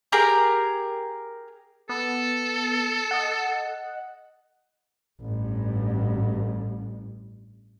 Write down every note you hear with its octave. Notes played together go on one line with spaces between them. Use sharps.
G4 G#4 A#4 A#5
B3 A4
D#5 F#5
A1 G2